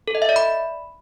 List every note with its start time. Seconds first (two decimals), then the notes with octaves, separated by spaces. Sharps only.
0.08 A4
0.15 D#5
0.22 E5
0.29 D5
0.36 B5